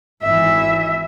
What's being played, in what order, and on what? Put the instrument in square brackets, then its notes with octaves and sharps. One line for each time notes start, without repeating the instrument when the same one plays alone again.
[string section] G#1 E3 [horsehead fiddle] E5